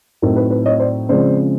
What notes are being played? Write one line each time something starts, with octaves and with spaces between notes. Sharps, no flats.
A2 F#3 A3 C4 D#4 A#4
B4
B4
C#5 D#5
C5 D5
C#3 F3 G#3 C4 C5 D5